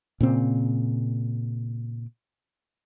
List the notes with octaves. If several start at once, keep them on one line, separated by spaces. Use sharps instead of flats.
A#2 C#3 C4